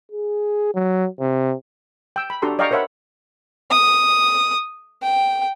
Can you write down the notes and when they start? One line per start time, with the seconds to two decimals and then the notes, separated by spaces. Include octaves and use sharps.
0.12 G#4
0.75 F#3
1.20 C3
2.16 G5 E6
2.30 B5
2.42 D4 F#4 G4 A4 A#5 C6
2.59 D5 D#5 F5 G5 A#5 C#6
2.71 A#4 C5 C#5 E5 F#5 B5
3.71 D#6
5.02 G5